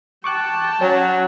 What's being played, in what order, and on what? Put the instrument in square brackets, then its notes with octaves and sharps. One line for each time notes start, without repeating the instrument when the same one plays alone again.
[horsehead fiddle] G5 A5 [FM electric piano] C#6 D6 F#6
[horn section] F#3 [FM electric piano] C#4